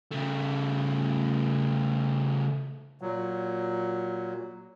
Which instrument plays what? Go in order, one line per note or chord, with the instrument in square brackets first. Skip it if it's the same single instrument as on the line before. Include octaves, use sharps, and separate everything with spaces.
[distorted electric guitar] C#3 A3
[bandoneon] A#2 F#3